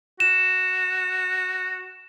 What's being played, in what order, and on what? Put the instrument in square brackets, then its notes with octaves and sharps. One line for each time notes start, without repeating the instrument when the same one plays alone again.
[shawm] F#4 [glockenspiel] E7